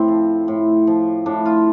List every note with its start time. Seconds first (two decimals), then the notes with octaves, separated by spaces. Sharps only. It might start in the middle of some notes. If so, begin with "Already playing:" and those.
Already playing: A2 C4
0.08 F3
0.48 A2
0.87 F3
1.26 A2 D4
1.45 F4